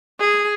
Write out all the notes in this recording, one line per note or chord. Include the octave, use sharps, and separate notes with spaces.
G#4